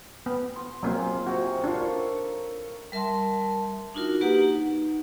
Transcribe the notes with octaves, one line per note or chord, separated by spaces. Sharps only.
B3
C6
F#3 A#3 C4 D#4 F4 G#4
C3 F#4
D4 F4 A4 A#4 C#5
G3 A#4 E5 A5 C6
D4 D#4 F4 F#4 A#4
A#3 G4 B4 F#5 A#5
D#4